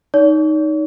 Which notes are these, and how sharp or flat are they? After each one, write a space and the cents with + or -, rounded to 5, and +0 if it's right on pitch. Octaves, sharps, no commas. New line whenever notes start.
D#4 +0 C#5 +45